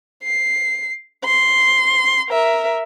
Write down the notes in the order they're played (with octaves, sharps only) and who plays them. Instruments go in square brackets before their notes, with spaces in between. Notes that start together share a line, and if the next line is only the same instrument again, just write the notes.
[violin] C7
C6
A#4 E5